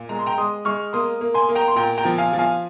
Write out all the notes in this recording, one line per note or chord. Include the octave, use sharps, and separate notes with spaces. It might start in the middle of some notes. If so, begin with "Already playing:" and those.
Already playing: A#2
G#3 A#5
C6
G5 A#5
G#3 C6 D#6
G#3 C#6 F6
A#3 C6 D#6
A#3
G#5 C6
A#3
G5 A#5
C6
A#2 G5 A#5
G5 A#5
F3
F5 G#5
F3
F5 G#5